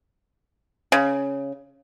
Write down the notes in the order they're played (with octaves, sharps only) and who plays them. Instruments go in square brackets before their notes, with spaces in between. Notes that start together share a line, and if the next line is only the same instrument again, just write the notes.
[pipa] C#3